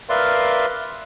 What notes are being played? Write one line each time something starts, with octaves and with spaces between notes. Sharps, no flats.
A#4 B4 D5 E5 F5 C6